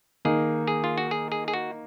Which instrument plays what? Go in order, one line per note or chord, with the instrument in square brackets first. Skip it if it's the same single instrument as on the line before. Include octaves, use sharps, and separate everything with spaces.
[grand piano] D#3 A#3 D#4 [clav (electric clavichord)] G#4
[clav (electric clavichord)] G#4
F4
F#4
G#4
G#4
G#4
F#4